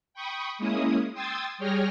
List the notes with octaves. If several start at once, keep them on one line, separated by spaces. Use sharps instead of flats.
G5 B5 C#6 D#6
G#3 A#3 C#4 E4 D#6
G5 C6 D#6 E6 G#6 A6
G3 G#4 C#5 G5 F6 A#6